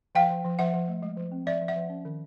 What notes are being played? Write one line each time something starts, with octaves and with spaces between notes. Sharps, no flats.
F3 F5 G5
F3
F3
F3 E5 F#5
F3
A3
G#3
F3
C4
F3 D5 E5
F3
E5 F#5
F3
C#4
D#3